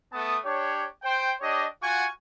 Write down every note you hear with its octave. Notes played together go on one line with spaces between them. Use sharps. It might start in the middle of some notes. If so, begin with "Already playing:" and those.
A3 B3 A5 D#6
D4 G4 C#5
C5 G5
D4 G4 C#5 D#5
F4 F#4 F#5 G#5 C#6